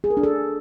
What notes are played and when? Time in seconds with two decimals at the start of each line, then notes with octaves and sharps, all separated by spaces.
0.04 G#4
0.10 A#4
0.17 D4
0.23 A4